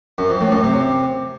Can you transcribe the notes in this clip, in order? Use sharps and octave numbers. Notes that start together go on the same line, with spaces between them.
F#2
F2
A2
F#2
C3